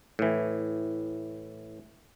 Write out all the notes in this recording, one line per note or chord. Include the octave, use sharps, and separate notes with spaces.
A2 E3